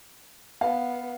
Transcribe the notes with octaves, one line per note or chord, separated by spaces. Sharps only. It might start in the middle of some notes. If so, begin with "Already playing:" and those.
B3 F5